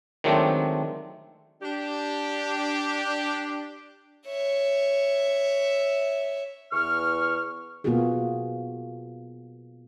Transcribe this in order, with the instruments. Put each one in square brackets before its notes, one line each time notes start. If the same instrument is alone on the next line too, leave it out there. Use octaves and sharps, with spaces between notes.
[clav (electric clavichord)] D#3 F#3 G#3 A3 C4 D4
[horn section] D4 G4
[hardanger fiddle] C#5 E5
[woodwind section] E2 C#6 F6
[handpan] B2 A#3 B3 F4 F#4 G#4